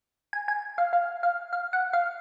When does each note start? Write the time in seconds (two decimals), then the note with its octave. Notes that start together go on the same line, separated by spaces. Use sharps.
0.33 G#5
0.48 G#5
0.78 F5
0.93 F5
1.23 F5
1.53 F5
1.73 F#5
1.93 F5